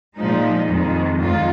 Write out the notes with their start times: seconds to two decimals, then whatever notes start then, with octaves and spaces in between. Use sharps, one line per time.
0.16 A#2 F3 G#3 D#4
0.68 F2 D#3 G#3
1.21 F2 D#3 G#3 F4